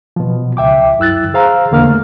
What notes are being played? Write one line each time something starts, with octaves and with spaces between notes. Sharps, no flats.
B2 F3
C#2 E5 G5 D6
F#2 E4 E6 F#6 A6
G#4 C5 F5 A#5 E6
E2 D3 A#3 F5 F6
A3